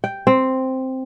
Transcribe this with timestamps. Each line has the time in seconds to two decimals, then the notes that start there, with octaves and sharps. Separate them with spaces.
0.04 G5
0.27 C4